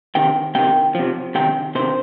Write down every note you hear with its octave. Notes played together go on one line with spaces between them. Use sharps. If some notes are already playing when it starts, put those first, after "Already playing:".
C3 D#3 G5
C3 D#3 G5
C3 F3
C3 D#3 G5
C3 D#3 C5